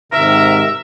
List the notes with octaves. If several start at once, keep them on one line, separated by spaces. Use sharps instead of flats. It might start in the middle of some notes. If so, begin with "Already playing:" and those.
G#2 C3 D#3 A#4 E5